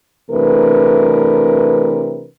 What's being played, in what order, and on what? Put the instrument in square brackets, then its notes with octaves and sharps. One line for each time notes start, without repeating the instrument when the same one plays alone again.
[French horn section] C3 E3 A3 D4 A#4 B4